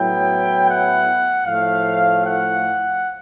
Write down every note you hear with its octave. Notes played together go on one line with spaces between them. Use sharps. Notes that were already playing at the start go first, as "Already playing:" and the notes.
Already playing: A2 F#3 B3 E4 G5
F#5
A2 F3 A3 F5
F#5